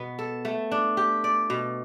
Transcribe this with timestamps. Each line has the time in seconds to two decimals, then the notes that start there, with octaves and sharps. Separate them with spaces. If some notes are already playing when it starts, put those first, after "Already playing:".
Already playing: B2 B3
0.19 A4
0.45 A3
0.72 D4
0.97 G4
1.24 D5
1.50 B2